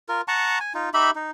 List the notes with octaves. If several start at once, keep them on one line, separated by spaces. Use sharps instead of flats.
F4 A#4
F#5 A5 A#5 C#6
G#5
D#4 F4
D#4 G4 E5 B5
D#4